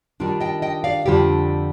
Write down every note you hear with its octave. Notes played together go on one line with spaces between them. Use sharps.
D#3 G3 D4 F4
D#5 G5
D#5 G5
D5 F5
F2 D3 G3 D4 F4 G4